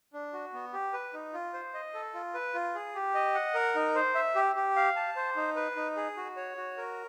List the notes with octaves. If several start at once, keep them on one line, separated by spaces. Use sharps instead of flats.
D4
F#4
B3
G4
B4
D#4
F4
C5
D#5
A4
F4
B4
F4
G#4
G4
D#5
F#5
A#4
D#4
C5
E5
G4
G4
F5
A5
C5
D#4
B4
D#4
G#4
F#4
C#5
F#4
A#4